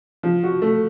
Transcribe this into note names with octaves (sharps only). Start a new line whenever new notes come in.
F3
F#4
A3